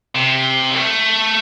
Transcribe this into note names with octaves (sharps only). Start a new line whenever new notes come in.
C3
G3
A3